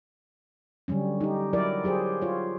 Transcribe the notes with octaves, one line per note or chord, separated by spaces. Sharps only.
D3 F#3 G3 C#4
D#4 G4
F#3 E4 A#4 D5
F#3 G4 G#4 C5
F4 C#5